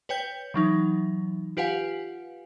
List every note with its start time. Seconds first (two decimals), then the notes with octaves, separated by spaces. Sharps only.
0.09 B4 C#5 G5 G6
0.54 E3 F#3 D#4
1.57 F4 G4 B4 F5 F#5 G#5